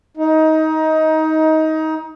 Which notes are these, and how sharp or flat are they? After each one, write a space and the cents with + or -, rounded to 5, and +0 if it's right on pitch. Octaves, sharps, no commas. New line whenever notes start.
D#4 +20